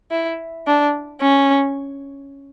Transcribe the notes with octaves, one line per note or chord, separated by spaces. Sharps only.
E4
D4
C#4